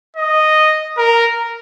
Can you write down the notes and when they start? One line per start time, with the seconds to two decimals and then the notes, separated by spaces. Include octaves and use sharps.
0.16 D#5
0.98 A#4